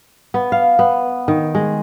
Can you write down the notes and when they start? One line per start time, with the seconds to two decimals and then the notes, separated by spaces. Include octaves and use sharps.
0.34 B3
0.52 F5
0.79 B3
1.28 D#3
1.55 G#3